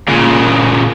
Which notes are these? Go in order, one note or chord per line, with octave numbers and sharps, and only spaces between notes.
A#2 C#3